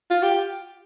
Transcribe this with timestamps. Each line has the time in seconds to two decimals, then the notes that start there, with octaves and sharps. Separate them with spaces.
0.10 F4
0.23 G4